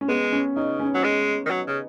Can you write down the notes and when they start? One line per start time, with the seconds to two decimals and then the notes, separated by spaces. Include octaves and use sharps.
0.01 C#4
0.08 G#3 B3
0.32 C#4
0.56 C#3 D#4
0.80 C#4
0.94 F#3
1.04 G#3
1.46 D#3
1.50 F#3
1.67 C#3